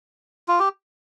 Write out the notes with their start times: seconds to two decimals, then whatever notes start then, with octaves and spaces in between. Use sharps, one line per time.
0.48 F4
0.59 G4